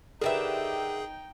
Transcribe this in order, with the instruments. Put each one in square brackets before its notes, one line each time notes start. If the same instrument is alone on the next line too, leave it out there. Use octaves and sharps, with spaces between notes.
[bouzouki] D3 G4 E5 [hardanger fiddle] D#4 G5 [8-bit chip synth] G#4 [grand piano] A#4 B4